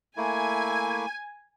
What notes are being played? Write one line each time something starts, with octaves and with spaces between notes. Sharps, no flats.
A3 A#3 E4 G#5